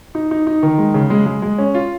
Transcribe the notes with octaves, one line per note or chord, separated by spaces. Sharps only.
D#4
D#4
D#4
D#3
G#3
C#3
G#3
G#3
G#3
C#4
F4